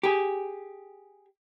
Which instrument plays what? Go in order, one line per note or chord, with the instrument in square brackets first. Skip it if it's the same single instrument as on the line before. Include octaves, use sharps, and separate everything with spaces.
[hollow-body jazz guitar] G4 G#4